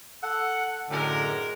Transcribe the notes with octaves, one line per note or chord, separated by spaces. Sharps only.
A4 F#5
F#2 A2 D3 G#3 A#4